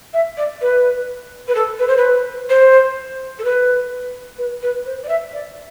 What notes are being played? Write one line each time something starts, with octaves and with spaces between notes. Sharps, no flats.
E5
D5
B4
B4
A4
B4
C5
B4
C5
A4
B4
B4
B4
C5
D5
E5
D5